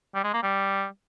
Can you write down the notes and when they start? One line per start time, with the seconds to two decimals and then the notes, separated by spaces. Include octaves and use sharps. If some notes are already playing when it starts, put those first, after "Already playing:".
0.14 G3
0.24 G#3
0.33 A#3
0.43 G3